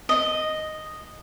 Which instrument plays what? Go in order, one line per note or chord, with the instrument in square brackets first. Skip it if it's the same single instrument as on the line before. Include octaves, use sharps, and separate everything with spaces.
[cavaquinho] D#5